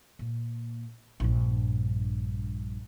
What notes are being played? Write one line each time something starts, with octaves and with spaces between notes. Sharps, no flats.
A#2
A#1 G2